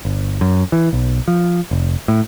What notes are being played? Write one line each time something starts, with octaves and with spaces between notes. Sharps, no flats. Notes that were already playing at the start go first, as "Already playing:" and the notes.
G1
F#2
E3
B1
F3
F1
A2